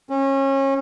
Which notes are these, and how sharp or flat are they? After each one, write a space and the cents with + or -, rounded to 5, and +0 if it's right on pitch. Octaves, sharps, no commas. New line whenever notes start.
C#4 -30